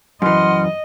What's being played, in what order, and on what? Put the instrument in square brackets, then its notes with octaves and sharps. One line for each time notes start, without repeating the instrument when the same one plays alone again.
[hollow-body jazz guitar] F#2 E3 [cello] D#5 [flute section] F#5 C6 F6